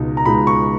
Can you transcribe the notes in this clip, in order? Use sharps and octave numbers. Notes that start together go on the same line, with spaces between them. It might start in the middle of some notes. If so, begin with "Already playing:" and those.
Already playing: C#2 B2 G#3 D#4
A#5
C#2 B2 G#3 D#4 B5
C#6